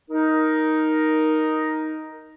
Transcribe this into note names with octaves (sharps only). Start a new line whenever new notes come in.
D#4 A#4